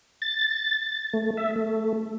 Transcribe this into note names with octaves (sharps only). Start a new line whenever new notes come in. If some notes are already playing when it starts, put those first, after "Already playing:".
A6
A3
E5
A3